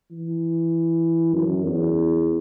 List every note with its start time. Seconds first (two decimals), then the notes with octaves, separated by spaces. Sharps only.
0.11 E3
1.35 F#2
1.66 E2